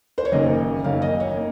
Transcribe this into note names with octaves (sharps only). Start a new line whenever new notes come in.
C5
C#5
F#1 F#2 D#3 A#3 D#5
F#1 F#2 D#3 A#3 F5
D#5
C#5
A#3